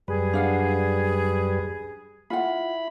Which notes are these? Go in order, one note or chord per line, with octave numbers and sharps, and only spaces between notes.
F#2 G3 G#4 B4
D4 F5 F#5
E4 F4 F#5 B5